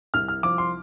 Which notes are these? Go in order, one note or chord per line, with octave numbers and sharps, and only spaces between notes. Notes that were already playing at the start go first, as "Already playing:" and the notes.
C2 F6
F6
F3 D6
C6